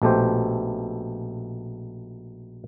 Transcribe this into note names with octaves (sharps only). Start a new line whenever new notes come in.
A#1 B2 A3 G4 C5